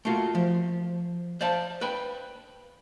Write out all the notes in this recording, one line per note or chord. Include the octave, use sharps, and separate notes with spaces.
A3 A#3 F4 F#4
F3
C5 D5 F5 A5
B4 G5 B5